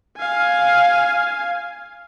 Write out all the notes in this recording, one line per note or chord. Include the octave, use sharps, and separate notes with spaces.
F5 G#5